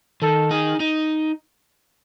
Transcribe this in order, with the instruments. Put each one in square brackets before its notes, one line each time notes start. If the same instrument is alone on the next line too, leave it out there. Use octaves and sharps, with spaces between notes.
[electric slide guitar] D#3 [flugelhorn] A4
[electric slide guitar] D#4 [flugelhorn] G#4
[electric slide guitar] D#4